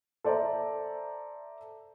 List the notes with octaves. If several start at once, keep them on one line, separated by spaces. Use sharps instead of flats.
A4 C5 D5 E5 A#5